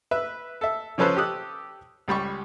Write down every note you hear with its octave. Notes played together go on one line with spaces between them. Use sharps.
B4 E5
A4 E5
C#3 F3 C#4 A4 B4 C5
G4 A4 D#6 F#6
C#2 G3 B5 C#6